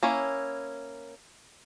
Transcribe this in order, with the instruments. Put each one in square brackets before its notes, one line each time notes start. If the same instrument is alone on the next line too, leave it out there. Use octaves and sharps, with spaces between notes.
[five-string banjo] A#3 C#4 E4 C#5